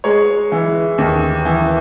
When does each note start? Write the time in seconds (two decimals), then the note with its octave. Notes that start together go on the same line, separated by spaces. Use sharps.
0.04 G#3 C#5
0.52 E3
0.98 D#2
1.45 E3